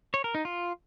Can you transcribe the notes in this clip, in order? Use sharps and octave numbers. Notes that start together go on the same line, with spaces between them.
C#5
A#4
D#4
F4